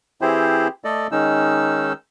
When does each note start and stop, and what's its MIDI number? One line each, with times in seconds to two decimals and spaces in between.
0.21 0.68 52
0.21 0.68 60
0.21 0.68 64
0.21 0.68 67
0.21 0.68 68
0.21 0.68 72
0.84 1.07 57
0.84 1.07 69
0.84 1.07 74
0.84 1.07 75
1.12 1.93 51
1.12 1.93 56
1.12 1.93 61
1.12 1.93 63
1.12 1.93 88